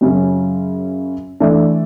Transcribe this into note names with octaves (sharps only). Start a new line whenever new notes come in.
F#2 C#3 F#3 C#4
E3 A3 D4